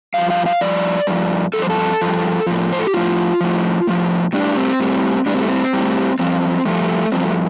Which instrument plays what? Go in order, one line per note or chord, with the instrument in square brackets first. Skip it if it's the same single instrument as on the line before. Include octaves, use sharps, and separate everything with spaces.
[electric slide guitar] G2 F3 F5
F5
F5
G2 F3 D5
G2 F3
G2 F3 A4
C5
A4
G2 F3
A2 F3
C5
A4
G4
A2 F3 F4
A2 F3
A2 F3
A2 G3 D4
C4
A2 G3
A2 G3 D4
C4
A3
C4
A2 G3
G2 F3 C4
G2 F3 A3
G2 F3 C4
A3